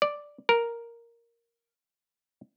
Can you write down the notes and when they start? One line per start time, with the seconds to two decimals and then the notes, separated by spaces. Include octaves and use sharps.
0.02 D5
0.49 A#4